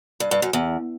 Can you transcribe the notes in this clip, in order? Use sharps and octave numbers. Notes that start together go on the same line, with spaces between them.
G2
G2
F#2
E2